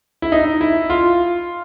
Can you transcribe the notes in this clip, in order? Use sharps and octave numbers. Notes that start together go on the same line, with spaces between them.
E4
D#4
E4
F4